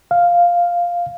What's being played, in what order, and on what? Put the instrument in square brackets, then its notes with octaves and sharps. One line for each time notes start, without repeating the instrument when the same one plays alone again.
[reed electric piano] F5